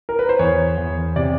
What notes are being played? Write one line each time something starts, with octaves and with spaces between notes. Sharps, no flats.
A#4
B4
C5
E2 C#5
E2
C3 D5